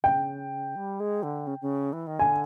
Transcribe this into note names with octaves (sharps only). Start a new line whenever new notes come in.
C#3 G5
G3
G#3
D3
C#3
C#3
E3
D#3
D3 G#5